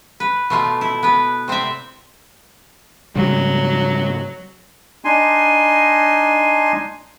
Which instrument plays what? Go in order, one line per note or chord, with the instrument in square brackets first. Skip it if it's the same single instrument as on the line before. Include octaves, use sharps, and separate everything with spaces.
[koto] B4
B2 A3 F4
E4
B3 B4
C3 C4 D5 E5
[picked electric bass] G#2 C#3 G3 [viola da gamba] F#3
[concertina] D4 D#4 G#5 C6